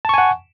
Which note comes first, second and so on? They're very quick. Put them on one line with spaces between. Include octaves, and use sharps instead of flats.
A5 C#6 G#5 F#5